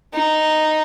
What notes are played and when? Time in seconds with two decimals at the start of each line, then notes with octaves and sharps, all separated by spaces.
0.14 D#4